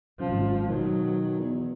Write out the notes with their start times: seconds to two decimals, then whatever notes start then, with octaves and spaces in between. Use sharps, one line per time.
0.19 G#1 F#2 F3
0.68 B2 D#3 F#3
1.39 E2